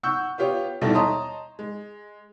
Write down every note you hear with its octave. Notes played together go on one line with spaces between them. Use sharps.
F#5 C#6 E6 G6
B3 F4 G4 C#5
D#2 B2 G3 E4 A4 A5
C#5 D#5 A5 A#5 C6 D#6
G#3